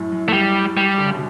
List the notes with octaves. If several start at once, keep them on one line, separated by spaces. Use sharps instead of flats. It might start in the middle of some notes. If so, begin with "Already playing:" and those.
Already playing: F#2 A2
F#2
A3
G3
G3
D3
C#3
B2